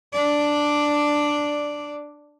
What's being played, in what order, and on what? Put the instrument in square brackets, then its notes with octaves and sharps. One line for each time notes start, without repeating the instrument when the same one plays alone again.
[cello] D4 D5